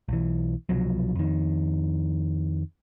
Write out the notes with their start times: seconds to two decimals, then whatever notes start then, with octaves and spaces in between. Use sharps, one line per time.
0.08 B1 E3
0.69 C2 B2 F3 F#3
1.15 F2 D#3